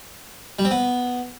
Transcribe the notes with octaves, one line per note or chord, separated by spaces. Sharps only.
G3
C4
B3